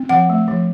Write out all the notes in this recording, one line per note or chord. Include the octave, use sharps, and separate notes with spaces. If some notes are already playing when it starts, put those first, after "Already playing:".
Already playing: C4
F3 F#5
A3
F3